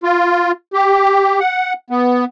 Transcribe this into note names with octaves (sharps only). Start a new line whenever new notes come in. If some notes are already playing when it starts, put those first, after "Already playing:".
F4
G4
F#5
B3